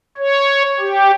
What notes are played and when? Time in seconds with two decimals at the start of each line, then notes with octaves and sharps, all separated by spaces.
0.18 C#5
0.80 G4